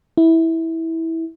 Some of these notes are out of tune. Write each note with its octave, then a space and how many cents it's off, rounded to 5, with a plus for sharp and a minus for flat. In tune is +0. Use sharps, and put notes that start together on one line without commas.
E4 -15